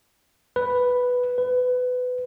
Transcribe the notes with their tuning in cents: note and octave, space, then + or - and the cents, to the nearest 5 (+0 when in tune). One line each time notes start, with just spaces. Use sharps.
B4 +0
B4 +20